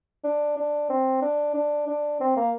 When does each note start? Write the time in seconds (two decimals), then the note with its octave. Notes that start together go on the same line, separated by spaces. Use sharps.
0.24 D4
0.57 D4
0.90 C4
1.22 D4
1.54 D4
1.87 D4
2.20 C4
2.36 A#3